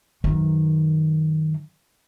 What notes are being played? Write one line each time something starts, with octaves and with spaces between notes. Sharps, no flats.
F#2 D#3